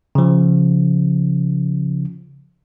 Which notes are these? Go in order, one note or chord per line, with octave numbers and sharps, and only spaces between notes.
C#3 F3